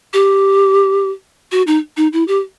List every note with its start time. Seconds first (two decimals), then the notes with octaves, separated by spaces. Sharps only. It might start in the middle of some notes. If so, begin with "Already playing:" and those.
0.13 G4
1.52 F#4
1.67 D#4
1.97 D#4
2.13 E4
2.28 G4